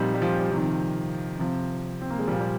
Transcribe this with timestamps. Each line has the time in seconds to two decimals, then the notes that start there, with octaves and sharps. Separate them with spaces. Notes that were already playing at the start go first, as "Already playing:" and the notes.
Already playing: A#2 F3 G3 C4 D#4
0.15 G3
0.22 F3
0.40 G3
0.51 C3 D#3 F3
1.39 C3 F3
2.02 C4
2.10 A#3
2.19 G#3
2.28 F3 G3
2.32 A#2
2.41 G3